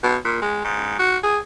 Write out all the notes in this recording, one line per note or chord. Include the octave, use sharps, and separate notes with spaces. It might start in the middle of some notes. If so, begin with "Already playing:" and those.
B2
A#2
G#3
G#2
F#4
G#4